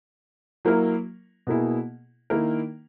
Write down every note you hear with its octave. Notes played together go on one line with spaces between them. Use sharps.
F#3 A#3 E4 A#4
B2 A#3 E4 G#4
D#3 A#3 E4 A#4